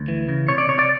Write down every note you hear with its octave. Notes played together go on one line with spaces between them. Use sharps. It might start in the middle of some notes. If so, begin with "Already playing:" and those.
Already playing: D2
E3
C#3
C3 C#5
D5
C3 C#5
D5